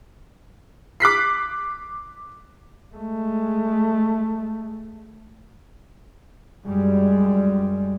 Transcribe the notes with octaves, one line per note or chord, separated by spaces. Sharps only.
D6 F#6 B6 C7
G#3 A3
F#2 G3 G#3